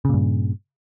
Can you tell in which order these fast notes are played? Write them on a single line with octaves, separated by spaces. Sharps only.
C#3 A#2 G2